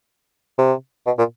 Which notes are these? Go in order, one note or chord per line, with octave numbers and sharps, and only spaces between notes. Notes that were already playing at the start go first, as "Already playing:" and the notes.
C3
B2
A#2